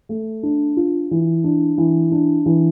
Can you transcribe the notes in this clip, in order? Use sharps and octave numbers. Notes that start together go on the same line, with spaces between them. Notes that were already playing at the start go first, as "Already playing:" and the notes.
A3
D4
F4
E3
D4
E3
D4
E3